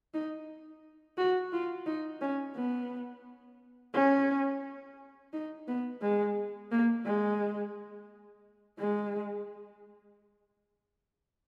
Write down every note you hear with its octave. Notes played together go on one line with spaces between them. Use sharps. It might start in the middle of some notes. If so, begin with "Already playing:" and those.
D#4
F#4
F4
D#4
C#4
B3
C#4
D#4
B3
G#3
A#3
G#3
G#3